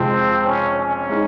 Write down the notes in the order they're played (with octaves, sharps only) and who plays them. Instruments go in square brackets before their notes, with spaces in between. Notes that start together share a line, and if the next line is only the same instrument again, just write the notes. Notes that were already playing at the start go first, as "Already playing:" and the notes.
Already playing: [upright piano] F2 C3 F3 G#3 [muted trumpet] C4
[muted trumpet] C#4
C#4
[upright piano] G#3 D#4